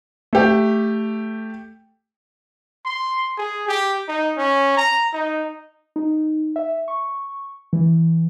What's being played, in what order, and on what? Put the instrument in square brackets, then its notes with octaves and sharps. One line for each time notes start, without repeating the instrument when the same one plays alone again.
[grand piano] A3 G4
[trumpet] C6
G#4
G4
D#4
C#4
A#5
D#4
[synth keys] D#4
E5
C#6
E3